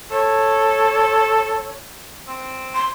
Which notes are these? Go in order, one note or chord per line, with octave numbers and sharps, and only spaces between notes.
A4 C#5
C4
C6